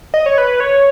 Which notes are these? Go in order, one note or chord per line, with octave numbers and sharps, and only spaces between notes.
D#5
C#5
B4
C#5